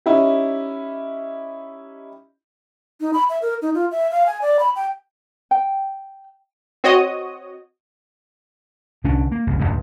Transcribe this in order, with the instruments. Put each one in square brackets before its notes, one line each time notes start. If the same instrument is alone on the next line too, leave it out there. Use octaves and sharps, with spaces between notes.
[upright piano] C#4 D#4 E4 G4
[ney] D#4
B5
E5
A#4
D#4
F4
E5
F5
G#5
D5
B5
G5
[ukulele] G5
[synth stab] C4 F#4 C#5 D#5 D#6
[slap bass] C2 D3 C#4 D4
A#3
F#1 C2
D1 G1 C#2 G2